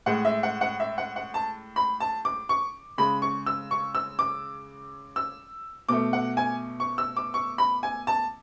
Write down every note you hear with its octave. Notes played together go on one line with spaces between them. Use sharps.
A2 G#3 F#5
E5
F#5
F#5
E5
F#5
F#5
A5
B5
A5
D6
C#6
C#3 G#3 B5
C#6
E6
C#6
E6
D6
E6
B2 A3 D6
F#5
G#5
C#6
E6
D6
C#6
B5
G#5
A5